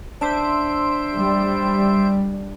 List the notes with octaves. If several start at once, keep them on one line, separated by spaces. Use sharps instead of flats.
D4 C5 E5 D7
G3